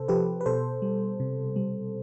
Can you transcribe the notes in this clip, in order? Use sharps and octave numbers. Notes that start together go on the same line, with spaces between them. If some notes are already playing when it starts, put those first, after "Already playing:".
Already playing: C3 A4 C5
F3 G4 B4
B4
B2 A4 C5
G3
C3
G3